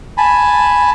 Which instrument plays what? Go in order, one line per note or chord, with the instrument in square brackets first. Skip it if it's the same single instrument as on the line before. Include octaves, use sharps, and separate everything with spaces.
[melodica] G#5 A5 B5